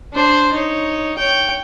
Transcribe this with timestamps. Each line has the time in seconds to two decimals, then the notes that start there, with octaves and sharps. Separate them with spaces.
0.13 D4 C5
0.53 D#4 C#5
1.18 C#5 G5